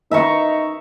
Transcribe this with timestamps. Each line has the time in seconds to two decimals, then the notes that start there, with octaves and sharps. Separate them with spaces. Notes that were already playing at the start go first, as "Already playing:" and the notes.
0.11 D#4 E5 A#5 C#6